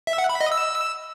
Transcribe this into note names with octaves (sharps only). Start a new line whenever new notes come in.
E5
F#5
B5
D#5
E6